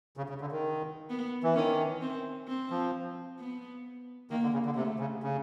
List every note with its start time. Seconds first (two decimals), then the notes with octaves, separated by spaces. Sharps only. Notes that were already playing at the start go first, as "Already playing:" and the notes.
0.17 C#3
0.29 C#3
0.41 D3
0.52 D#3
1.10 B3
1.43 E3
1.56 D#3 C#4
2.01 C4
2.48 C4
2.70 F3
3.39 B3
4.31 D#3 A#3
4.43 D3
4.53 C#3
4.66 D3
4.76 C3 A3
4.99 C#3
5.23 C#3